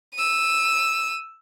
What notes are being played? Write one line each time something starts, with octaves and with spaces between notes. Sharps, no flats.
E6 D#7